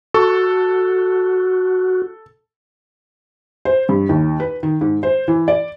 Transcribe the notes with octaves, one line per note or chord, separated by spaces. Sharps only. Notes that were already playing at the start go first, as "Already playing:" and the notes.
F#4 A4
C5
G2
D#2
B4
D#3
G#2
C5
E3
D5